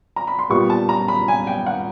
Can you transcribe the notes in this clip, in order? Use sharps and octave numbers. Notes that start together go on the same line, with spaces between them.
A#5
B5
C6
A#2 G3 B3 C#6
A5
A#5
B5
G#5
G5
F#5